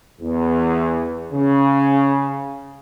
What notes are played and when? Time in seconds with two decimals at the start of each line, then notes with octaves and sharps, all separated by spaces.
0.21 E2
1.32 C#3